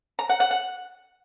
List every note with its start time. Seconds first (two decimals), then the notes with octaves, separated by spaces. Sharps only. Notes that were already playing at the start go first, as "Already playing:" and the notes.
0.19 A#5
0.29 F#5
0.40 F#5
0.51 F#5